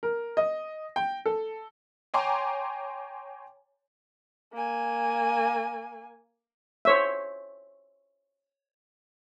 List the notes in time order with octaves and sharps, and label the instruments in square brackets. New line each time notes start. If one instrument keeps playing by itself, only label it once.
[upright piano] A#4
D#5
G5
A4
[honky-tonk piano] C#5 G5 G#5 A#5 C6 D6
[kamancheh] A#3 G#5
[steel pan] C5 C#5 E5